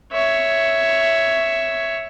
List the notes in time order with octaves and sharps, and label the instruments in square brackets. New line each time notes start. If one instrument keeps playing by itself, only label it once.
[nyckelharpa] C#5 E5